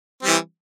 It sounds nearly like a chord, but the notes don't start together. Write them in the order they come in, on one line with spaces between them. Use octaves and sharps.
C4 G3 E3